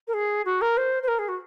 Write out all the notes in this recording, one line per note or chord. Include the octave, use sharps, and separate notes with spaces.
A#4
G#4
F#4
A#4
C5
C5
A#4
G#4
F#4